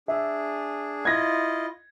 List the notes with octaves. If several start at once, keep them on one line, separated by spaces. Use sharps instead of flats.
D4 G#4 E5
E4 F4 D#5 G#6 A#6